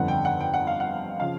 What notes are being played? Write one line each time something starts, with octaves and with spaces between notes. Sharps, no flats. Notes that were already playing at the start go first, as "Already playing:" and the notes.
Already playing: G1 F2 D3 F#5
G5
F#5
G5
F#5
F5
F#5
C#3 F3 F5